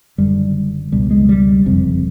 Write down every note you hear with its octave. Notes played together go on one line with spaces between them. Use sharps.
F#1 F#2 D3 G3
C#2 B2 G3
G#3
G3
F#1 F2 C3